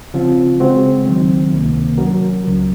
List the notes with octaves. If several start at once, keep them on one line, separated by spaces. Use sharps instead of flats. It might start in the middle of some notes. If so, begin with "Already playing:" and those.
C#3 F3 C4 F4
C#3 G#3 C4 F#4 C5
D#3 F#3 C4
C#2 C3 D#3 A#3
F#3 C#4 F#4 A#4
C#2 C#3 F#3